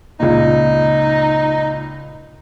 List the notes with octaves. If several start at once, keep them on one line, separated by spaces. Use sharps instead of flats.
C#2 A#2 D#4